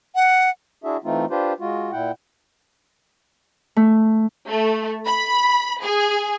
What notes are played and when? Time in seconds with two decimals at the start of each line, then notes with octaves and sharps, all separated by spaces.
0.15 F#5
0.84 D4 E4 F#4 G#4 E5
1.04 E3 A3 C4 D#4 F4
1.30 D4 F4 G4 B4 C5
1.60 G#3 F4 F#4
1.92 A#2 E4 F#5 G5
3.76 A3
4.48 A3
5.06 B5
5.82 G#4